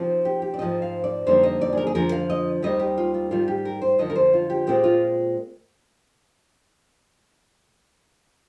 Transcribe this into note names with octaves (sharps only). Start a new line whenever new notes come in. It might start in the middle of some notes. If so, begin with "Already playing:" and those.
Already playing: C3 F3 C4 D#4
G4
G4
D5
G#2 F3 C4 D#4 D#5
F5
D5
F2 D3 G3 A#3 D#4 C5
D#5
D5
G#4
A#4
G#4
F2 D3 F3 A#4
F5
D#5
D#2 D#3 G3 C4 D#5
G4
F4
F4
G#2 D#3 G3 F4
G4
A#4
C5
F2 D3 F3 D#5
A#4
C5
F4
G4
A#2 G#3 C4 F4 G4
F4